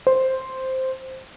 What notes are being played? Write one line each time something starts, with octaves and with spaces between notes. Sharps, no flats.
C5